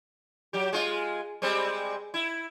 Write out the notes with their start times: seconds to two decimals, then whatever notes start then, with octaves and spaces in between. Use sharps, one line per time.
0.53 F#3 G4
0.73 G#3 F4
1.42 G3 G#3 C4
2.14 E4